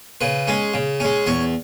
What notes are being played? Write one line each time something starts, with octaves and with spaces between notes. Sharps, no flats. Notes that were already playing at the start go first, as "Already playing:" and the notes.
C#3 B4
G#3 C#4
C#3
G#3 C#4
E2 C#5